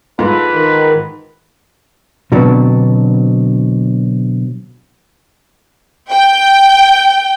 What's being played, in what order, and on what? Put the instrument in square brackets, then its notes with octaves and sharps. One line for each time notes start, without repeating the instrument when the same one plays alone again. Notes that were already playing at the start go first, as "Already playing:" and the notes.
[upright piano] G#2 [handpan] F4 A4 [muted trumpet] B4
[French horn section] D#3 A#4
[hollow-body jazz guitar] B2 D3 F#3 B3 C4 D4
[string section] G5